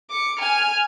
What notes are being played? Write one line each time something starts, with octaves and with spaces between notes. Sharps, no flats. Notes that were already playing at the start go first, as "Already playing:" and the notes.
D6 C#7
G#5 F6